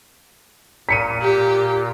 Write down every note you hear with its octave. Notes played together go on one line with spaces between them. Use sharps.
A#2 B6 C#7 D#7
G4